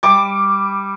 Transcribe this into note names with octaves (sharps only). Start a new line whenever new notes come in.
G3 D6